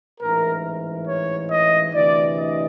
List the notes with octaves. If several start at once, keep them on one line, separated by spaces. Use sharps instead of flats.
A1 G#2 E3 A#4
C#5
D#5
D2 C3 E3 D5
D#5